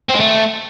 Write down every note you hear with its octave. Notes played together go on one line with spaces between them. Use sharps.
C4
G#3
A3